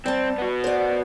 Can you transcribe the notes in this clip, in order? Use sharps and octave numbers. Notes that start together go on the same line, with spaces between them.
G3 C4 A5
B3 F#4
C5 D5